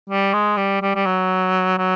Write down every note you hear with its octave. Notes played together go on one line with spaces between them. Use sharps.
G3
G#3
G3
G3
G3
F#3
F#3